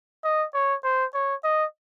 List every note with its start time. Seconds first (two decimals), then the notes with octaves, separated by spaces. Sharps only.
0.24 D#5
0.54 C#5
0.84 C5
1.14 C#5
1.44 D#5